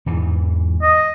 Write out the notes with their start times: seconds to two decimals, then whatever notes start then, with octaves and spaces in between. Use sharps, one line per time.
0.06 E2 G#2 E3
0.82 D#5